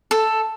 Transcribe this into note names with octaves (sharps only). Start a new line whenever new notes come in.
A4